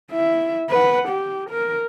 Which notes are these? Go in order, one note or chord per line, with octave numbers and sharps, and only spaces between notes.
E4 E5
B4 F#5
G4
A#4